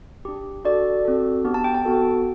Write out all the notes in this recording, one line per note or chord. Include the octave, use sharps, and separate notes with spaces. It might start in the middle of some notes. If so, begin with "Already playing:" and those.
D4 G4
D4 F#4 A4 D5
C4 F#4 A4
B3 D4 G4
A5
G5
A5
B3 F#4 A4